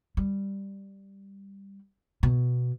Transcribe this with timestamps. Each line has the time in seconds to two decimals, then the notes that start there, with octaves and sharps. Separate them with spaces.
0.17 G3
2.23 B2